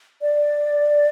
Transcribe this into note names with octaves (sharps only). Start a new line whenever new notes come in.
D5